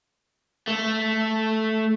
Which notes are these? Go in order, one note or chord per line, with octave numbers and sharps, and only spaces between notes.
A3